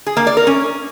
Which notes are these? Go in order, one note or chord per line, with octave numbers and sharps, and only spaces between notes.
G#4
A#3
D5
A#4
C#4